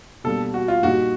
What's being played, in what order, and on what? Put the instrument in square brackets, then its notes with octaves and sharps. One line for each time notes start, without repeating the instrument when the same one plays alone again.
[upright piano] B2 G3 A#3 D4 [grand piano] A4
[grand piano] F#4
F4
[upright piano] A#2 G3 A#3 D#4 G4 [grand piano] F#4